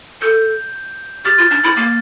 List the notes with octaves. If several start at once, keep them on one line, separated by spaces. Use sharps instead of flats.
A4 G6
G4 F6 A6
F4
D4
E4
A#3